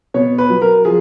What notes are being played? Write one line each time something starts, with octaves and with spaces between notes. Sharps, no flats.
B2 C#5
B4
F#3
A#4
F3 G#4